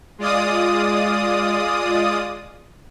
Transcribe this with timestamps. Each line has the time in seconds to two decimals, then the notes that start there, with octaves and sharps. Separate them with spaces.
0.18 G#3 F4 D5 D#6